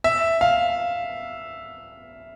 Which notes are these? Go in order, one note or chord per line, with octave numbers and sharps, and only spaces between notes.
E5
F5